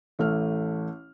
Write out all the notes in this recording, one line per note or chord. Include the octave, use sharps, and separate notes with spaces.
A1 A3 F6